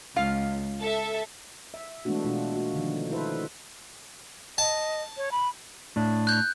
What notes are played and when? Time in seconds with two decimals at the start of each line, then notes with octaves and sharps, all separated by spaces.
0.16 C#2 F4 F5
0.81 A4 E5
1.74 E5
2.05 E3 G#3 A3 B3 D4 F#4
2.24 B2 G#3 D4 F4
2.52 A#3 F#4
2.74 D3 D#3 F3
3.11 D#4 E4 A4 B4 C5 E5
4.58 D#5 A5
5.17 C#5
5.31 B5
5.96 A2 D4
6.27 F#6 G6